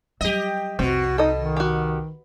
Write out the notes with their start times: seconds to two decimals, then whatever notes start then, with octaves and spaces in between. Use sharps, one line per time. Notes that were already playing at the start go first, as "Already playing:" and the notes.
0.21 F#3 G3 G4 D#5
0.79 C2 F2 B2 C4 F#4
1.18 D#4 A4 D#5
1.36 D#3
1.57 F#4 G4